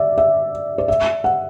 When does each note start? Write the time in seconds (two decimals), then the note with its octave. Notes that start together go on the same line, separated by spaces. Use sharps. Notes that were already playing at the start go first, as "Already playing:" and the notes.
Already playing: D5 E5
0.18 E5
0.78 D5
0.88 E5
1.24 F#5